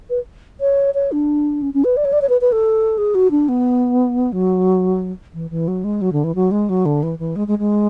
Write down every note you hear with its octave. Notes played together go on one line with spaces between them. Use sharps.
B4
C#5
C#5
D4
C#4
C#4
B4
D5
C#5
D5
C#5
B4
B4
A4
G#4
F#4
D4
B3
F#3
E3
E3
F#3
G#3
F#3
D3
E3
F#3
G#3
F#3
D3
E3
E3
G#3
G#3
G#3